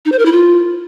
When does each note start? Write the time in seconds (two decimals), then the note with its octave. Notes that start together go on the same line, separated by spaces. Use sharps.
0.05 D#4
0.12 C5
0.19 A#4
0.26 E4
0.32 F4